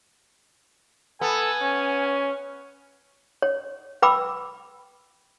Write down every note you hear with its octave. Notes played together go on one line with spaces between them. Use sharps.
B3 A4 G#5
C#4
C#5
B4 G5 B5 D6 E6